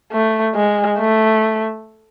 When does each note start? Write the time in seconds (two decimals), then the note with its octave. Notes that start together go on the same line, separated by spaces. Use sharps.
0.12 A3
0.55 G#3
0.99 A3